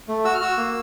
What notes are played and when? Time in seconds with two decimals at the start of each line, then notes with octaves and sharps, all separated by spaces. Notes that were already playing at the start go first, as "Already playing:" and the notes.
0.08 A3
0.24 F#4 E6
0.35 F6
0.41 F#4 E6
0.57 A#3